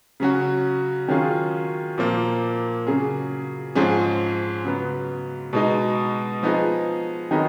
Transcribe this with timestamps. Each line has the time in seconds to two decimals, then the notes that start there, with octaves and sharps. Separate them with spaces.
0.20 C#3 F#3 C#4 F#4
1.08 D#3 F#3 C#4 F4 G#4
1.98 A#2 F3 A#3
2.87 C#3 F#3 C#4 G#4
3.75 G#2 F3 G#3 C#4 G#4
4.64 C#3 F#3 B3
5.53 B2 G#3 D#4
6.43 F3 B3 D#4 G#4
7.31 D#3 F#3 B3 D#4 G#4